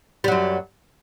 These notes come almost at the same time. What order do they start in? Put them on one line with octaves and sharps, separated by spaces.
G3 F#3 F#2